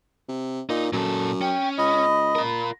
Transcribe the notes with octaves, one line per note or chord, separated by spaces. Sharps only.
C3
A#2 D#4
F#2 A#2 A4
C#4 G5
C#2 D#5 B5
F4 A#4